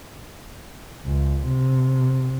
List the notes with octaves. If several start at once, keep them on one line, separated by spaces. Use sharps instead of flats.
C#2
C3